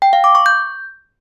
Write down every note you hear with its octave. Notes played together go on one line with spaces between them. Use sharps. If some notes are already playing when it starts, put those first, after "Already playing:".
G5
F5
D6
C#6
G6